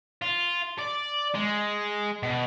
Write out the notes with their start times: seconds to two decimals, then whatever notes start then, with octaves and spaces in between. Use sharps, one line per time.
0.22 F4
0.78 D5
1.35 G#3
2.23 B2